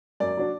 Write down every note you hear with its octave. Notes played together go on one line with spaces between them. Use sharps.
F#2 D5
F#3 D4